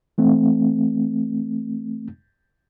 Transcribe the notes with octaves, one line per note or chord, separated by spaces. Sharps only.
E3 A3 C4